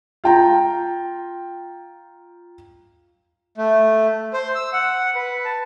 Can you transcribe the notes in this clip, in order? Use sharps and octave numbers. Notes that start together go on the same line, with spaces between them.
F4 G5 A#5
A3
C5
E6
F#5
B4
A5